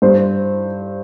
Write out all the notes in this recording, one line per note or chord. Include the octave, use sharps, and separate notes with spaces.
G2 C5